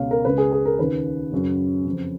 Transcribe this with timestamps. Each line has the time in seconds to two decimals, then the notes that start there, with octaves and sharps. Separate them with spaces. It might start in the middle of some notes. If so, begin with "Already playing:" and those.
Already playing: C#2 B2 C#5 F5
0.11 A#4
0.25 C#2 C#3 B4
0.38 G#4
0.52 G#4
0.65 A#4
0.79 D#2 C#3 B4
1.32 F#2 C#3
1.86 F2 C#3